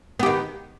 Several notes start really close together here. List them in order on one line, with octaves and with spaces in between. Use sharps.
B3 G4 D#3